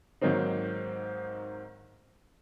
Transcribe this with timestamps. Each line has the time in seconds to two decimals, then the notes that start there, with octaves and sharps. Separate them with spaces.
0.21 G#2 D#3 F#3 A#3 C4 D#4